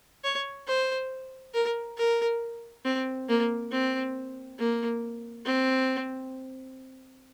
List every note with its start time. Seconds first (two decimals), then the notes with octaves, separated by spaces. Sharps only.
0.24 C#5
0.68 C5
1.54 A#4
1.97 A#4
2.85 C4
3.29 A#3
3.72 C4
4.59 A#3
5.45 C4